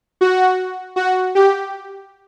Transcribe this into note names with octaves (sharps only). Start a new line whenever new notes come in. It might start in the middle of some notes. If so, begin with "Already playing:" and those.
F#4
F#4
G4